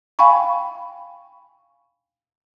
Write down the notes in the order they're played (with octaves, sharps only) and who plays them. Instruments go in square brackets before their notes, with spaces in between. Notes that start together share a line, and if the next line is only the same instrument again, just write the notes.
[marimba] F5 G5 G#5 B5 C#6